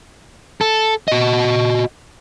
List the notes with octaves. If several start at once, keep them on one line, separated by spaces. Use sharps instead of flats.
A4
F#4 D#5